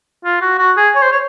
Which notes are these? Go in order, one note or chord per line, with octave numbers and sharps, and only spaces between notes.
F4
F#4
F#4
G#4
C#5
C5
C#5